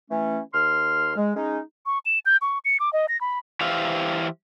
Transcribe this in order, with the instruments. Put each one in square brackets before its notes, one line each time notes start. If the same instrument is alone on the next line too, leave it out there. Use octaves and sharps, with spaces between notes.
[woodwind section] E3 A3 C#4
D#2 C6 F6
G#3
G#3 C#4 D#4
[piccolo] C#6
E7
G6
C#6
C#7
D6
D#5
A#6
B5
[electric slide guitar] E3 G4 C5 E5 F5